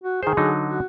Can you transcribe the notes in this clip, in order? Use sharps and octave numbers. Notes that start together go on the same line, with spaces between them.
F#4
D#3 G#4 C5
D3 F#3 D#4
F#4